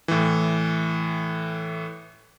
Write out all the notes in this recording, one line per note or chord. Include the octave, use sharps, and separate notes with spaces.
A2 E3